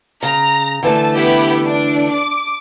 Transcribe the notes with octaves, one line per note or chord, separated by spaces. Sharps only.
C#3 A#5
D3 E3 A3 A5
B3 E4 G4
D4 D7
D6